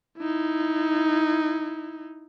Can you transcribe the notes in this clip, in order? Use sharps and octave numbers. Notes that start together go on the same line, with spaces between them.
D#4 E4